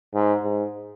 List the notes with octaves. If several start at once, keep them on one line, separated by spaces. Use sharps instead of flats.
G#2
G#2